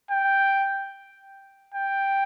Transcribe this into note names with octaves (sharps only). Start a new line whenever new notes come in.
G5
G5